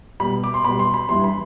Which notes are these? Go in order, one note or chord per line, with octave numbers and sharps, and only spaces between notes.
B2 G3 B5
D6
C6
B2 G3 B5
C6
B5
G2 E3 G3 C6
B5